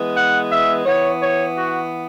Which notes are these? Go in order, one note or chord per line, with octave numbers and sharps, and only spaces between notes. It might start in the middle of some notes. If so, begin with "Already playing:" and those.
Already playing: E3 G#3 B3
F#5
E5
E3 B3 C#5
C#5
F#4